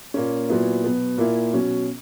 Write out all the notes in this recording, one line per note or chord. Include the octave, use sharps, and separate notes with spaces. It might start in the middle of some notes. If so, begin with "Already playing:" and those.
A#2 A#3 C#4
A#2 F#3 B3 E4
B2 F#3 B3
A#2 A#3 E4
B2 F#3 C#4